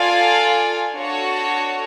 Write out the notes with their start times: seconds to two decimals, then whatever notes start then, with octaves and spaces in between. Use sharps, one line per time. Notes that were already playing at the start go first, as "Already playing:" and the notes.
Already playing: F4 A4 D5 F5 G#5
0.94 D4 F#4 A4 C#5